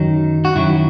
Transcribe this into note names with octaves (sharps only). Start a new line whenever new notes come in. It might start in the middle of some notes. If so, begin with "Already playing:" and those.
Already playing: F#2 D#3 F#3 D#4
F#4
F#2 D#3 F#3 E4